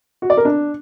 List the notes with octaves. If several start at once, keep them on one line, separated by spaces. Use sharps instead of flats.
F#4
D5
A#4
D4